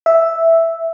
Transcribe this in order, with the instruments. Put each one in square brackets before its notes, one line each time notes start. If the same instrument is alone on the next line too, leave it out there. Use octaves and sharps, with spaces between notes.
[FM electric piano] E5